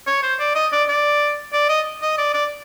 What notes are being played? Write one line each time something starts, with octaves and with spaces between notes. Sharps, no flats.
C#5
C5
D5
D#5
D5
D5
D5
D#5
D#5
D5
D5